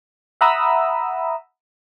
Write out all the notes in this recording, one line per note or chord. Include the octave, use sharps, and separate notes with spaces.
E5 F#5 A#5 B5 D#6 E6